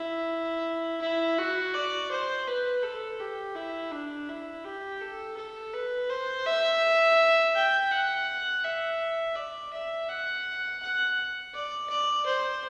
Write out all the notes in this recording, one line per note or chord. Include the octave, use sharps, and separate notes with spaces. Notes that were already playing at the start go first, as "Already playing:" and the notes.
Already playing: E4
E4
F#4
D5
C5
B4
A4
G4
E4
D4
E4
G4
A4
A4
B4
C5
E5
G5
F#5
E5
D5
E5
F#5
F#5
D5
D5
C5